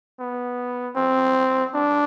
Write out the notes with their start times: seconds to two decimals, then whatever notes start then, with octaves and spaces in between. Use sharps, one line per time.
0.20 B3
0.96 C4
1.74 D4